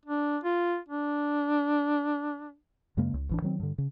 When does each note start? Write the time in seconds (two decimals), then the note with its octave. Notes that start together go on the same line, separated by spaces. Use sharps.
0.06 D4
0.44 F4
0.89 D4
2.97 F#2 C#3 G#3 A#3
3.14 C#2
3.29 A1 E3 D4
3.42 D#3 F#3 C4
3.60 G2 D3
3.78 C#3